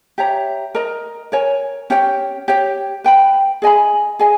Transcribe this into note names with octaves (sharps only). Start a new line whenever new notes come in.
G4 C#5 E5 A#5
A#4 D#5 A#5
A#4 C#5 G#5
C#4 G4 C#5 G5
G4 C#5 G5
B4 G5 B5
G#4 D#5 G#5 B5
G#4 D#5 G#5